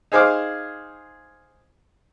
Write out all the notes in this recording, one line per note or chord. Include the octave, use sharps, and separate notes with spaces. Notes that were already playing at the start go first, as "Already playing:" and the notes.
D#4 G#4 C5 F5 D6